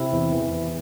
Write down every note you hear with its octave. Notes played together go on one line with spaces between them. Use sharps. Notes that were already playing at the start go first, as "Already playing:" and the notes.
Already playing: C3 E4 E5
E2
E3
E2